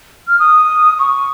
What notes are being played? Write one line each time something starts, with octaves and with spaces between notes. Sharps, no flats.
F6
D#6
C#6